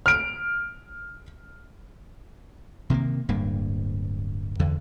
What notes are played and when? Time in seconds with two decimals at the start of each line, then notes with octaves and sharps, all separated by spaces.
0.06 F6 D7
2.90 C3 D#3 G#3 A#3
3.29 D1 G2 A#3
4.59 E2 D3